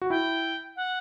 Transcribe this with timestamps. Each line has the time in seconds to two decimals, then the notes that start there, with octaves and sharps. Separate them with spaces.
0.02 F#4
0.10 E4 G5
0.76 F#5